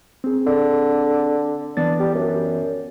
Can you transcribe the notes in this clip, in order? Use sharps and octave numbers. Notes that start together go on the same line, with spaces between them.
C4 G#4
D3
E3 B3 D4 A6
G3
F#2